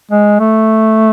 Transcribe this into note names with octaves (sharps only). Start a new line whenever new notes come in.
G#3
A3